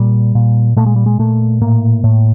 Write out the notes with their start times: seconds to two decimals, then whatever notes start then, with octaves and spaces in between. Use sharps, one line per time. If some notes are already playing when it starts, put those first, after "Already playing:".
Already playing: A#2 G3
0.35 A#2
0.76 A#2 A3
0.86 G#3
0.96 G3
1.06 G#3
1.19 A#2 A3
1.61 A2 A#3
2.04 A2